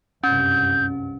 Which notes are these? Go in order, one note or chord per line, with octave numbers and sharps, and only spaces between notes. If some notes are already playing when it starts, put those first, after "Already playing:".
F#1 C2 G2 C#4 G6